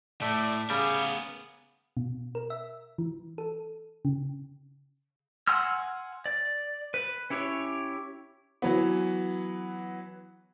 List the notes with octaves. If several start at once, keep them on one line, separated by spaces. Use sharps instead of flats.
A2 A3 D5
C#3 G3 B3 G#4 A#4
B2
A#4
E5
E3
A4
C#3
F#5 G#5 C6 E6 F6
D5
B4
C#4 E4 G4 C#5
E3 F#3 B3